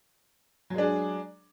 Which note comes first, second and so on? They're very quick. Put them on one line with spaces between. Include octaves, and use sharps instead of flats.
F#3 G#3 D4 G#4